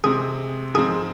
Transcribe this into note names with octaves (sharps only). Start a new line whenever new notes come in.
C3 G#3 C4 G#4
G#2 F3 G#3 C4 G#4